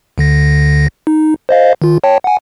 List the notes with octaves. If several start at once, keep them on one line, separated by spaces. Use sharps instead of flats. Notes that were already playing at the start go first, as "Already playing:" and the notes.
D2 D3 A#6
D#4
C5 D#5 F5
D#3 F4
C#5 G5 A5
F#5 G#5